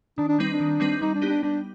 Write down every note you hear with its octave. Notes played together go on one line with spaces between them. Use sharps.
D#3 D4
D4
G3 C4 D#4 B4
D4
D#3
G3 C4 D#4 B4
G3 D#4
D4
B3 D#4 G4
D4
G3 D4